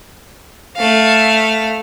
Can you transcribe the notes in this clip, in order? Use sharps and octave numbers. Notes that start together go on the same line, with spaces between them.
A3 F5